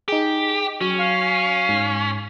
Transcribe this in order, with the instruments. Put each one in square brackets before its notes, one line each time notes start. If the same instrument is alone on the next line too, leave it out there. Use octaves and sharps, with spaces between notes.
[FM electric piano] D#4 G#4 [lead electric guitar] G4
[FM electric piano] F#3 [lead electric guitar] C#4
[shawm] F5
[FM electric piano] G#2